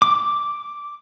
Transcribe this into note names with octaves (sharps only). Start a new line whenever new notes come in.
D6